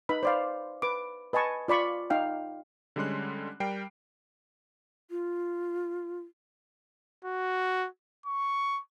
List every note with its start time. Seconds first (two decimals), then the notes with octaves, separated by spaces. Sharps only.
0.09 D#4 B4 B5
0.23 C5 D5 F5
0.82 B4 D6
1.33 B4 D#5 G#5 A5 C#6
1.68 F4 D5 B5 C#6
2.10 D#4 F5 G5
2.96 D3 G3 G#3 C#4 C6 F#6
3.60 G3 A#4 G5 C7 D7
5.10 F4
7.24 F#4
8.26 C#6